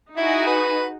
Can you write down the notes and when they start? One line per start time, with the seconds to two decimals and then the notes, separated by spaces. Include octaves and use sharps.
0.17 D#4 E4 F#4 G#4
0.47 B4